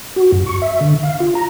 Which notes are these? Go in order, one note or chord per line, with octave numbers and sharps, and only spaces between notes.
F#4
F#2
C#6
E5
D3
F5
F4
A#5